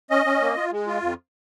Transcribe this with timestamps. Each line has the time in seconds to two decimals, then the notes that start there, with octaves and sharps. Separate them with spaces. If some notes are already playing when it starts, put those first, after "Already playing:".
0.10 C#4 D#5
0.26 C#4
0.41 A#3
0.57 F4
0.72 G#3
0.87 F4
1.02 F2